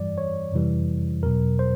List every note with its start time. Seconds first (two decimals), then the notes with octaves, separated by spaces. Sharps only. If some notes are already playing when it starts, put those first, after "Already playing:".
Already playing: G2 E3 G3 D5
0.18 C#5
0.52 F2 C3 E3 G3
1.23 E2 B2 F#3 A#4
1.59 C5